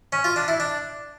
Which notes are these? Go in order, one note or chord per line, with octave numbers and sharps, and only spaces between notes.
C#4
F4
D4
E4
D4